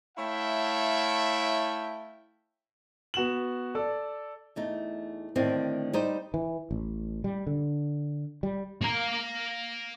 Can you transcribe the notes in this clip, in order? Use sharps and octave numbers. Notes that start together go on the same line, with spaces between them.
A3 E4 C#5 E5 F5 G5
B3 F#4 E7 F#7
A4 D5
E2 A3 D#4
A2 D3 D#3 C4
G3 D#4 C5
E3
A1
G3
D3
G3
A#3 A#5